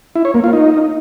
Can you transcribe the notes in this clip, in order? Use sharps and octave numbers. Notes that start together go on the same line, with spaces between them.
E4
C#5
A#3
F4
D#4